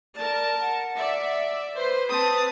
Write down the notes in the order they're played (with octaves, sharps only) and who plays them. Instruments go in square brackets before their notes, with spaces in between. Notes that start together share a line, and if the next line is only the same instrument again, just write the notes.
[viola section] A#4 A5 [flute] D5
[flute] F#5
[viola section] D5 E5
[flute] B4 [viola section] C5
[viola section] C4 [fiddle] A5 D#6